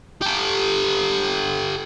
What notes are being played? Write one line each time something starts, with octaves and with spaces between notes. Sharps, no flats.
G4 A4